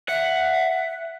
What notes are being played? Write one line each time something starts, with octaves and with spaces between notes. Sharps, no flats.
E5 F#5